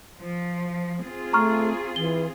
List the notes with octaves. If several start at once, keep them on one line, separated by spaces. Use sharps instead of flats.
F3
C4 F4 G#4
A3 A#5 C#6 F6
E3 G7